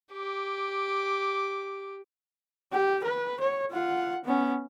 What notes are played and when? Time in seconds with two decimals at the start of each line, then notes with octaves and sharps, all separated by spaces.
0.13 G4 D6
2.72 G4
3.04 B4
3.40 C#5
3.70 F4 F#5
4.25 B3 C#4